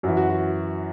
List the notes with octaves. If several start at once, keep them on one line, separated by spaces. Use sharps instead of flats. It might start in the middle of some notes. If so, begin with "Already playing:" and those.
F#2 E3 F#4
F#4
F#4